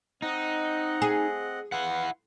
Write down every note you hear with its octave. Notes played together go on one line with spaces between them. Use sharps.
C4 D#4 D#5 F#5
G#4
E4 B4 F5 F#5 C6